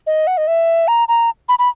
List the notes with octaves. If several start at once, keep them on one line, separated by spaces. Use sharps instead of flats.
D#5
F#5
D#5
E5
A#5
A#5
B5
B5